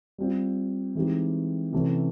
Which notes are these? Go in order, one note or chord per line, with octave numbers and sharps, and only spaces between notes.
G3 C4 F4
E3 G#3 C4 D#4 G4
C3 E3 A3 C#4